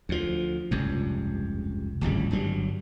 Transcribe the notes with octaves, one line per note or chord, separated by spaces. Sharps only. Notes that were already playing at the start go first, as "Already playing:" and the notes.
D2 F3
F1 C#2 G2
D1 G#1 C#2 G3
G1 G2 F#3 G3